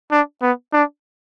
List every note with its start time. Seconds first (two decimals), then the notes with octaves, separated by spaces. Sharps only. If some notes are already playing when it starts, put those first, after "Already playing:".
0.11 D4
0.42 B3
0.73 D4